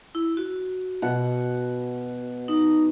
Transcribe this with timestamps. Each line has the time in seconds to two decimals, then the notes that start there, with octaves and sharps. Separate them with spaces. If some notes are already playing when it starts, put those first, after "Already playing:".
0.15 E4
0.37 F#4
1.02 B2 F#5
2.48 D#4